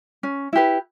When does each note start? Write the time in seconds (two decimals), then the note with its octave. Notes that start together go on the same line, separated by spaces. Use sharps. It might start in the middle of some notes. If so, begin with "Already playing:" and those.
0.23 C#4
0.53 E4 G4 B4